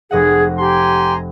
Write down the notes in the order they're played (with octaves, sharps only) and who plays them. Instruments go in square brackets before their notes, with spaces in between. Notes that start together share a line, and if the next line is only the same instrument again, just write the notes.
[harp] F1 D#5 F#5 [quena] G#4
[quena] G4 [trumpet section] G#5 A#5 C6